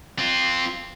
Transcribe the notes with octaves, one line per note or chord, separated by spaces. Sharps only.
C4 F4